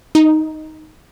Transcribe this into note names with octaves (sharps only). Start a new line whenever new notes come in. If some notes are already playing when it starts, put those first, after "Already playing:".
D#4